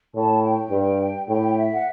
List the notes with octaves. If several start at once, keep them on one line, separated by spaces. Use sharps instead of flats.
A2 A5
G5
G2
A2 G5
E5
F#5